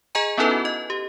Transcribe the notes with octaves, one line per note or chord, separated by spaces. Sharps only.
G#4 D#5 G#5 A#5
B3 C#4 D#4 E4 A4 B4
F#4
D#5
G4